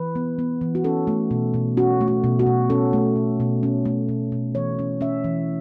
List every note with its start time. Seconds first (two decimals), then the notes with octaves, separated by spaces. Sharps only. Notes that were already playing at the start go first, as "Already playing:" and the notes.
Already playing: E3 B4
0.15 B3
0.39 B3
0.61 E3
0.75 F#4
0.84 C#4 A4
1.07 A3
1.31 B2
1.54 B2
1.77 C#4 F#4
2.01 A3
2.08 F#4
2.24 B2
2.39 F#4
2.46 B2
2.70 C#4 A4
2.93 A3
3.16 B2
3.40 B2
3.63 C#4
3.86 A3
4.09 B2
4.32 B2
4.55 E3 C#5
4.79 C#4
5.01 C#4 E5
5.24 E3